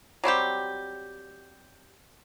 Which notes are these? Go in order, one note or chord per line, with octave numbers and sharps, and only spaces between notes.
F#3 G3 C4 G4